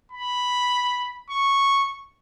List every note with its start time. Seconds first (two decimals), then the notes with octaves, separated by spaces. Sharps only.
0.12 B5
1.30 C#6